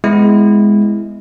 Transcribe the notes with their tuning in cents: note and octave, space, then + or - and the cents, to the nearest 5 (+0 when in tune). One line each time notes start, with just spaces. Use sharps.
G#3 +0 B3 +25 E4 +0